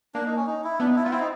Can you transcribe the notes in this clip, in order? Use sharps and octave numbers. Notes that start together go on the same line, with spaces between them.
A#3 D4
D#4
C#4
D#4
E4
B3 D4
D#4
E4
F4
B3
C4 E4
D#4